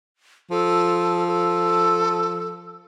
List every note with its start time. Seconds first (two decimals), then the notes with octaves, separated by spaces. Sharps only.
0.51 F3 A4
1.27 A4